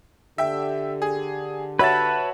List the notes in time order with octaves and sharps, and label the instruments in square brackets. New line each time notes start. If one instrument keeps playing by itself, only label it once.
[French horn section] D3 G4 [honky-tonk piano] E5 G5
[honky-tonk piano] G#4
[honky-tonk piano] F#4 C#5 E5 [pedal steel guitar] B4 A5